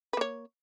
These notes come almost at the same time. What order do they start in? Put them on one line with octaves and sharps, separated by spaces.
B4 A#3 C#5